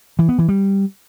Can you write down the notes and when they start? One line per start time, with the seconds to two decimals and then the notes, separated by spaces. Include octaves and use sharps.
0.19 E3
0.29 B3
0.39 E3
0.49 G3